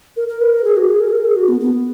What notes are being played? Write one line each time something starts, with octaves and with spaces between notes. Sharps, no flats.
A#4
A#4
B4
A#4
G#4
F#4
G#4
A#4
G#4
A#4
G#4
F#4
B3
B3